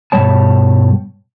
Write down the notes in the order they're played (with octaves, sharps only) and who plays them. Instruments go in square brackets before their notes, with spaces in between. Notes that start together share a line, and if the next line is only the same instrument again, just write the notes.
[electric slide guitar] G2 B2 G3 C#5 A5